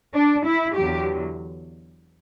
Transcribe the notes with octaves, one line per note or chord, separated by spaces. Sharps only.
D4
E4
E2 D3 F#3 G4